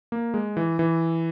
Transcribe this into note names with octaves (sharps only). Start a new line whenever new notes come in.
A#3
G#3
E3
E3